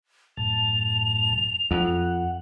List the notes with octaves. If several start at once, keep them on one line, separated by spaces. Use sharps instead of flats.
F#2 A2 A5 F7
F2 F#5